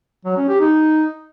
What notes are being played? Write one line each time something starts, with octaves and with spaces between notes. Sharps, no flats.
F#3
C#4
G4
D#4